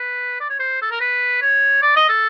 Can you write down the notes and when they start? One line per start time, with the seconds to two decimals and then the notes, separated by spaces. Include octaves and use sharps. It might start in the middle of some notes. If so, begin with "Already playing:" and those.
Already playing: B4
0.41 D5
0.50 C#5
0.60 C5
0.82 A4
0.91 A#4
1.01 B4
1.42 C#5
1.82 D5
1.96 D#5
2.09 A4